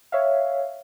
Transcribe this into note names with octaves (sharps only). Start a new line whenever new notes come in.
C#5 E5 F5